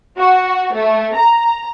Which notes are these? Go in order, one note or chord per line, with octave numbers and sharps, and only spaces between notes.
F#4
A3
A#5